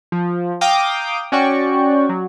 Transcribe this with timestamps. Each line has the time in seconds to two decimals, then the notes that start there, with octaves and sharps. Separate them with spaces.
0.12 F3
0.61 F5 G5 A#5 D6 D#6
1.32 C#4 F#4 D5 G5 C#6
2.09 F#3